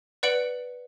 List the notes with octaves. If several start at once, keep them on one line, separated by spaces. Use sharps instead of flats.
B4 D5 F#5 C#7 D7 F#7